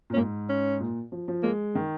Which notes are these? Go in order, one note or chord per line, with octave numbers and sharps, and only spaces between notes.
A#2
C#4
G#2 A#3
C#4
A#2
F3
F3
G#3 A#3
D#3 D#4